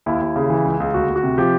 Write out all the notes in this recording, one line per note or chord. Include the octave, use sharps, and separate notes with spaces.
D#2 E4
D#2
C#3
E3
C#2
C#2
D2 F#4
D2
F#4
C3
F3 G4